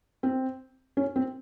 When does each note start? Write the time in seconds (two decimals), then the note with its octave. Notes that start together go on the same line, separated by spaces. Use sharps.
0.23 C4
0.97 C#4
1.16 C4